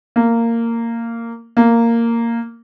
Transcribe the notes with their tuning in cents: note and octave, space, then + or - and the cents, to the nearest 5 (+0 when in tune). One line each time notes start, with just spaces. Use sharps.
A#3 -15
A#3 -10